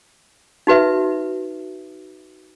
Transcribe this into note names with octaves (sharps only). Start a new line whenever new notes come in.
D#4 F#4 B4 E5